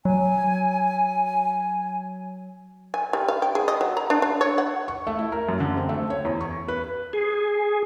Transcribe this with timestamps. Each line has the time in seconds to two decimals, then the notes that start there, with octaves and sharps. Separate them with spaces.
0.05 F#3 G#5
2.94 G#5
3.13 G3
3.28 F5
3.42 G5
3.55 G#4
3.68 D#5
3.81 F#3
3.97 A#5
4.10 D4
4.22 D4
4.41 C#5
4.58 F#5
4.88 C#6
5.07 A3
5.19 E4
5.32 A#4
5.49 F#2
5.60 D3
5.77 C4
5.89 A3
6.10 C#5
6.25 E2
6.41 C#6
6.68 B4
7.13 G#4